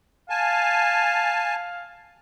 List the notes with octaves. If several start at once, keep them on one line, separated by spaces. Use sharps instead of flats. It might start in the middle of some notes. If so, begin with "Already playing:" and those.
F5 G#5 A5